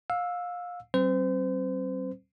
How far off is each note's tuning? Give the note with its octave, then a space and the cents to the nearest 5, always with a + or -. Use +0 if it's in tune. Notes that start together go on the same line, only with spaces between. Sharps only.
F5 +25 E6 +0
G3 -45 C4 +30 C5 -35